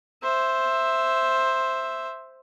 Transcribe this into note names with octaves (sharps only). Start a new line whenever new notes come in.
C5 E5